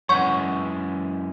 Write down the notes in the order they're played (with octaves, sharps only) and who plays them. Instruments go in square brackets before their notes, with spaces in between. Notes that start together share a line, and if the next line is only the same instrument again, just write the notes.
[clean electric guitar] F#2 E3 G#3 [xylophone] C#5 F#5 G6 [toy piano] C#6